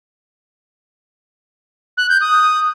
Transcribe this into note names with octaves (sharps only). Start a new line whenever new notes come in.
F#6
G6
D#6